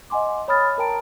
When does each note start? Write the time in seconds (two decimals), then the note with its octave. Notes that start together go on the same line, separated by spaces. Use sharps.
0.10 D#5 F#5 G#5 C6 D6
0.48 C#5 B5 D#6 F6 A6
0.78 A#4 G5 A5 A#5 D7